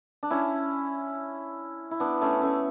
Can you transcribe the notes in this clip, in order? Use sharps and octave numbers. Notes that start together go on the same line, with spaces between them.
D4
C#4 E4
E4
B3 D4
A3 C#4
A3 C#4